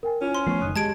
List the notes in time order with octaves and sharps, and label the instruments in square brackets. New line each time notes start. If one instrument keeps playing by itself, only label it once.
[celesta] A#4 G5 G#5
[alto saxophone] C#4 [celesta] E4 F4
[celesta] C5 F6 [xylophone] C6
[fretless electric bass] F3 A3 B3 [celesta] C#6 C7
[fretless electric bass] F#1 D#3 [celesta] D#6 F#6 D#7
[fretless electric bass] G#3 [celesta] G4 G#4 [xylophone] A5 G#6 D7